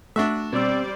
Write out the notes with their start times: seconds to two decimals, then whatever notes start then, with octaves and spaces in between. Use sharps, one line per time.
0.16 A3 D4 F#4 E5
0.53 B2 G3 C4 C5 D5 E6